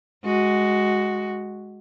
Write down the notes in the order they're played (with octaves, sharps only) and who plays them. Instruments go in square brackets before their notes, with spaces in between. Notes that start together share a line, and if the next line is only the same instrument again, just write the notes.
[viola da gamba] G#3 F#4